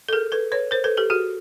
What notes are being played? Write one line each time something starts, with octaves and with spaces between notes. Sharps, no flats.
A4
G#4 A#4
A4 B4
B4 C#5
A#4 C5
A4 B4
G4 A4
F#4 G#4